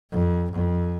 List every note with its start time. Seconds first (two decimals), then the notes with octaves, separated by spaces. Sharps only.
0.12 F2
0.51 F2